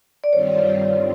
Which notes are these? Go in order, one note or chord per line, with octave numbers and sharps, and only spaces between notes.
D5
G2 D#3 G3 C4 F4 C#5